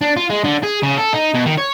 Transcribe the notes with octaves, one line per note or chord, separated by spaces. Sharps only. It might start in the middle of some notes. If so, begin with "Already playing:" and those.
D4
F4
G#3
D3
G#4
C#3
A4
D#4
B2
D#3
C#5